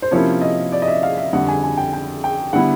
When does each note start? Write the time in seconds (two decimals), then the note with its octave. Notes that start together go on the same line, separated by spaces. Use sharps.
0.02 C5
0.11 C3 F3 A#3 C#4 E4 C#5
0.41 D#5
0.72 D5
0.82 D#5
0.88 E5
1.03 F5
1.17 E5
1.33 F2 D3 G3 F#5
1.48 G#5
1.64 G#5
1.77 G5
1.93 G5
2.24 G5
2.53 D3 G3 B3 E4 F#5